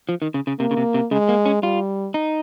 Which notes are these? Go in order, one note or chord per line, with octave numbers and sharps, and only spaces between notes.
F3
D#3
C#3
C#3
C3 A#3
C#3
C3
C3
C#3 G#3
A#3
C#4
G3 F4
D#4